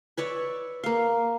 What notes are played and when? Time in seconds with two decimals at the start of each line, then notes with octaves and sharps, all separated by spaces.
0.17 B4 C#5 D5 E5
0.84 A#3 F5